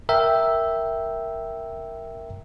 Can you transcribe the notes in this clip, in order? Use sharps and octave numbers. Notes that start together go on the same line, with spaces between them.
A#4 E5 G5